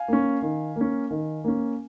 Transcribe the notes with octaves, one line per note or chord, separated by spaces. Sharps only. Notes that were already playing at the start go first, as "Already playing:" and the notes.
Already playing: F5 G#5
A#3 C#4
D#3
A#3 C#4
D#3
A#3 C#4